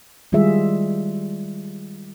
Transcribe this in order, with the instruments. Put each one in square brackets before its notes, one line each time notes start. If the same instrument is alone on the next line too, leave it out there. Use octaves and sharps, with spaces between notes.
[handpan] D#3 G3 G#3 F4 G#4 E5